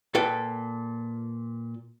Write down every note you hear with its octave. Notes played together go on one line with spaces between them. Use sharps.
A#2 A4 B4 G5